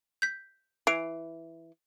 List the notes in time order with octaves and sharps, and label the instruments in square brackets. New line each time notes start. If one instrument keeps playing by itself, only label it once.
[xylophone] G6 B6
[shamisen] E3 [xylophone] C7 D7 F7